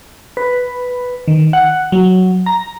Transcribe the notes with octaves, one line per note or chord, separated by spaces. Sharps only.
B4
D#3
F#5
F#3
A#5